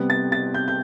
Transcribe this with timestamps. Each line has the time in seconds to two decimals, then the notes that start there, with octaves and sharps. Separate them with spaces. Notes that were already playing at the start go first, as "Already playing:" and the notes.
Already playing: C3 G3 B3
0.10 A6
0.32 A6
0.54 G6
0.68 G6